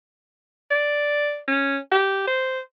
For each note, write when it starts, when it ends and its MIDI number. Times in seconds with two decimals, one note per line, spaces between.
0.71 1.40 74
1.48 1.78 61
1.92 2.23 67
2.28 2.60 72